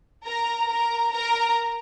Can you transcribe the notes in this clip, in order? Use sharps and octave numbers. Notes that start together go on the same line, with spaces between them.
A#4 A#5
A#4 A#5
A#4 A#5